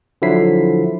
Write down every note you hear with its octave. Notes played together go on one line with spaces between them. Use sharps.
D3 F3 F#3 E4 B6 C7